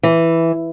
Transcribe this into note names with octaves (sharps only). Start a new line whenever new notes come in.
E3